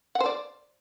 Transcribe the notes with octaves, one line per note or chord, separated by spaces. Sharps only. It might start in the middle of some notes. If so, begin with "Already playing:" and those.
F#5
C5
D5